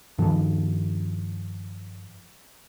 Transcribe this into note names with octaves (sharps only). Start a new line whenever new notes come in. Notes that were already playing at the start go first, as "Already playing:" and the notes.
G2 D#3 F3